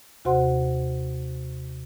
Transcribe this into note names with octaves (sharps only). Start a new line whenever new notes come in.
D#2 C3 F#4 C5 F#5 C6